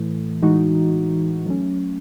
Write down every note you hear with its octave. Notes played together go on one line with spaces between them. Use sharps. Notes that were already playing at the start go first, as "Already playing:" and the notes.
Already playing: A2 E3 A3
A2 E3 G#3 D#4 F#4
F#3 A3 C#4